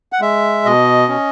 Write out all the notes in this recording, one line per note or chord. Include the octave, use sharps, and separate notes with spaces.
F#5
G#3 E5
B2 D#5
C#4